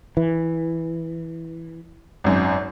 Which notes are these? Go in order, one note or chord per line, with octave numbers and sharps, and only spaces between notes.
E3
G#1 F#2